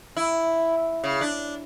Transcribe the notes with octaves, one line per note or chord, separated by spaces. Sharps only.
E4
C#3
D4